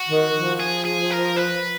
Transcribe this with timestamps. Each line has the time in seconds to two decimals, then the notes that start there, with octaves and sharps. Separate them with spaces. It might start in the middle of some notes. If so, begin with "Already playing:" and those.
Already playing: F#4
0.09 D#3
0.35 F3
0.60 G#4
0.85 G#4
1.11 A#4
1.37 B4